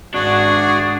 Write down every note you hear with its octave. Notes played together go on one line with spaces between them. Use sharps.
G#1 D4 F#4 G#4